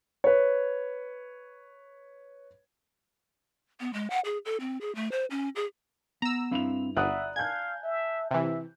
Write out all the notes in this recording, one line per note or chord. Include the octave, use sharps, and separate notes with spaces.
B4 C#5
B3
G#3
F#5
G#4
A4
C4
G#4
A3
C5
C#4
G#4
B3 A#5 E6
G2 C4 E4 F5 B5 F7
G1 D5 E5 F#5 A#5 B5 D#6 F#6
F5 G#5 A5 G6 G#6
E5
C3 E3 E5